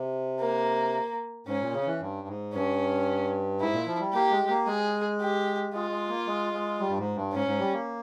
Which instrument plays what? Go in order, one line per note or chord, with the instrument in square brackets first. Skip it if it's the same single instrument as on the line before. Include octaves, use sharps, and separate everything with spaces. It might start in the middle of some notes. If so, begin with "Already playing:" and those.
Already playing: [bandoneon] C3
[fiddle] A#3
[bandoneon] G#2 [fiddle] C#4
[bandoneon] A#2
C#3
E3
G2
G#2
[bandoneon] G2 [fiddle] C#4
[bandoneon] G#2 [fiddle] E4
[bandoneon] A#2
F3
G3
[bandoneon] A#3 [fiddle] G4
[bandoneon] G#3
G#3
A#3
[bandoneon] G#3 [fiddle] G#4
[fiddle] G4
[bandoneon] G#3 [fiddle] F4
[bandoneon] G#3
A#3
G#3
G#3
G3
G2
G#2
G2
[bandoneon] G#2 [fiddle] C#4
[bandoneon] G#2
G3
A#3